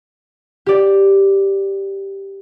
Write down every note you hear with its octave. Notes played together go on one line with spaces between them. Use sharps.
G4 D5